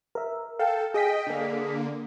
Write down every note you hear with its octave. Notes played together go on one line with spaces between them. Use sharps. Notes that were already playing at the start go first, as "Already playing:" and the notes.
A#4 E5
A4 F5 G5
G#4 D#5 G5 D#6 B6
D3 A#3